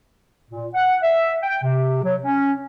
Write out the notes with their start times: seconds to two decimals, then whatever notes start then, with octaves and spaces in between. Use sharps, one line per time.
0.51 A#2
0.74 F#5
1.02 E5
1.43 G5
1.63 C3
2.04 F#3
2.23 C#4